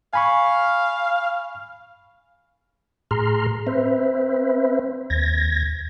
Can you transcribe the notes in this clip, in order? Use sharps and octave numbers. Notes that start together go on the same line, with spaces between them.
F5 G#5 B5 C#6
A2 G#4 A#5 C6 F6
C4 B4 C5 E5
D#2 G#6 A#6